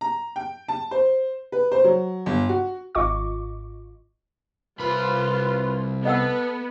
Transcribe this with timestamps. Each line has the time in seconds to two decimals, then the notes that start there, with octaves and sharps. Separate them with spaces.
0.01 A#5
0.36 G5
0.68 A5
0.91 C5
1.52 B4
1.72 C5
1.84 F#3
2.26 G1
2.49 F#4
2.95 G#1 F4 D#5 C#6 D6
4.79 C2 F4 B4 B5
6.05 B3 A4 D#5 F#5 E6